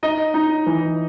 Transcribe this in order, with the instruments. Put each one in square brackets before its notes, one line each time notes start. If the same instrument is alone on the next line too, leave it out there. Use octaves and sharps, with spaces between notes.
[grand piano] D#4 D#5
D#4
E3